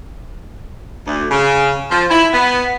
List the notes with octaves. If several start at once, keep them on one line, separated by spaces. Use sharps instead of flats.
D2
C#3
F3
E4
B3